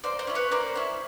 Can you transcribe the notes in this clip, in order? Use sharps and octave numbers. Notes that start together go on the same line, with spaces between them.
A#3 C5 D5
C5 D5
C#4 E4
B4 C#5
A#3 C5 D5
C#4 E4